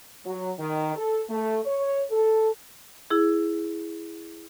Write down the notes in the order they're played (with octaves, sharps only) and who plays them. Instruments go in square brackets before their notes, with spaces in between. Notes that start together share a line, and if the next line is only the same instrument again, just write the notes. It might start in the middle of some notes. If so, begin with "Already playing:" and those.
[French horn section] F#3
D#3
A4
A3
C#5
A4
[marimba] E4 G#4